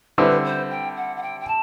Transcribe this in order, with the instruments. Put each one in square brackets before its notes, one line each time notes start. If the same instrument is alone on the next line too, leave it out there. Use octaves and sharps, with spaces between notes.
[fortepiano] D3 G3 C4 E4 [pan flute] B4
[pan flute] C5
G5
F#5
F#5
G5
G5
A5